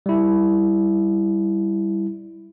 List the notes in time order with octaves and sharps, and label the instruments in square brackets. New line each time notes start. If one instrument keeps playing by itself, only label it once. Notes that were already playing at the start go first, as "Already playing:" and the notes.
[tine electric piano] G3 E4